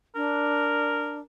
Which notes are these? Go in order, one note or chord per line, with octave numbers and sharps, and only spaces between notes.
D4 A#4